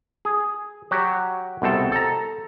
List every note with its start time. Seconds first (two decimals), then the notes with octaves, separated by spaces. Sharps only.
0.25 G#4
0.91 F#3 F#4 G4
1.62 C2 B2 C4 A4
1.92 A4 A#5